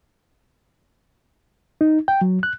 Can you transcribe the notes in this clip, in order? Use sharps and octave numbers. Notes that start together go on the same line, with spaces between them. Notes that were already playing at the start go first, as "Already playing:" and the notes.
D#4
G5
F#3
F#6